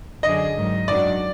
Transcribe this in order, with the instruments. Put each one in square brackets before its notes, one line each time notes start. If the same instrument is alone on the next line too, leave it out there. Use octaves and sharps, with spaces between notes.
[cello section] F#2 D3 F#3 D4 G#4 [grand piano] D#5
[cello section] G#2 D#3 F#3
[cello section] F#2 D#3 F#3 D4 F#4 [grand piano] D5